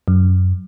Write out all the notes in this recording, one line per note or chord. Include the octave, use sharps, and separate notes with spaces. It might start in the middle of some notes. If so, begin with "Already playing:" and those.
F#2